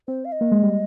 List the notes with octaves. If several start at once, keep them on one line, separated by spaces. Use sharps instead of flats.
C4 C5
F5
D#5
A#3
G#3
G3